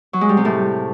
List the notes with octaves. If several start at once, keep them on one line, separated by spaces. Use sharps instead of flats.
F#3
G#3
G3
C3
A2